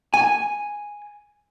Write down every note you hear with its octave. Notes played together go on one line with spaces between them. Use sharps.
G#5